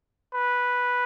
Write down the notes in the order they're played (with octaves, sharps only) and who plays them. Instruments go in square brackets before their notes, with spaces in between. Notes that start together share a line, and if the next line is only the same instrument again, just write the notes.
[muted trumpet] B4